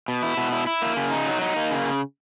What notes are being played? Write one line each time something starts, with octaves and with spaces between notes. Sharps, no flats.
B2
E4
B2
E4
E4
A#3
C#3
D#4
F#3
D#4
A#3
C#3